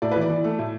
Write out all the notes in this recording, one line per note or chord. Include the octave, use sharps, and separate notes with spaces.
A2 D5
E3 B4
D5
E3
A3
A2